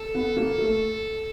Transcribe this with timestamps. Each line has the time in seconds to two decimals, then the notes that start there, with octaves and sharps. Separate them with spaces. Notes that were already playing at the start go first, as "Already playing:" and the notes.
Already playing: A4
0.15 B3
0.37 A#3
0.58 A3